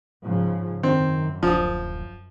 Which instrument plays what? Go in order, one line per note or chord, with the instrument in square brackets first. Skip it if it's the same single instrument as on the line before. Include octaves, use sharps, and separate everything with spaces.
[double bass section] G#2 C#3 F3
[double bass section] F#2 [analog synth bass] D#3 [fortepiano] C4
[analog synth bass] D1 [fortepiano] F3 D#6